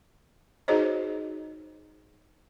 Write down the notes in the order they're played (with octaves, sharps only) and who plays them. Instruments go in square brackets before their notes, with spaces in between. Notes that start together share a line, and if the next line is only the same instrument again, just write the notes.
[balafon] D#4 F#4 G#4 C5 C#5 D#5